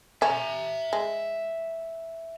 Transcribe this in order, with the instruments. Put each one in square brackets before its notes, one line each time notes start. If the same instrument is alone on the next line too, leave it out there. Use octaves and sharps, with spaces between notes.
[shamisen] C#4 [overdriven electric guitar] E5 A#5
[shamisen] G#3